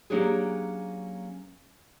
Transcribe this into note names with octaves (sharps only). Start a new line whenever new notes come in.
F#3 A#3 C#4 D4 G4 G#4